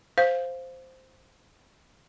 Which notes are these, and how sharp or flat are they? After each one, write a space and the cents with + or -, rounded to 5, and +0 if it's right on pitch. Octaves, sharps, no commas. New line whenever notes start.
C5 +0 F5 +0